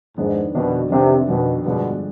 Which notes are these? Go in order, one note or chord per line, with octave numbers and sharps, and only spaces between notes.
F2 G#2 D#3 B3 D4
F2 B2 D#3 B3 D4
F2 C3 D#3 B3 D4
F2 B2 D#3 B3 D4
G2 B2 D3 F3 G#3 D4